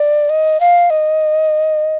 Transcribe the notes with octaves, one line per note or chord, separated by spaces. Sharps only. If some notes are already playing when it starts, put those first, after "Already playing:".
Already playing: D5
D#5
F5
D#5